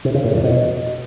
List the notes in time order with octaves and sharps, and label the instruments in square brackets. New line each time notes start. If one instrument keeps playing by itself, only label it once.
[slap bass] C3
C#3
A2
F2
B2